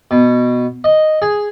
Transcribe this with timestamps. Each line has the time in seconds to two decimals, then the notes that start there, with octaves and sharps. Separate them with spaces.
0.11 B2
0.84 D#5
1.22 G#4